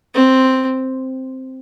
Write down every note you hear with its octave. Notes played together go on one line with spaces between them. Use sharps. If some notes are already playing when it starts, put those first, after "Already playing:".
C4